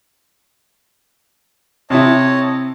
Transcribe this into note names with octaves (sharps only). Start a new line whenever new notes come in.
C3 E4 C#5 D#5 A5